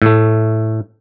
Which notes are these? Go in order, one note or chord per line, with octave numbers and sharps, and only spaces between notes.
A2 A3